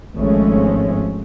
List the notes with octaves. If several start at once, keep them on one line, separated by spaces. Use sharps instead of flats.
G#1 F3 G#3 A3 C#4